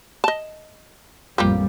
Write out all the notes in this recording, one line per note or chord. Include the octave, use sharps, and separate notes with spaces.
D#5 A5
A1 F2 G3 A#3 F4 G4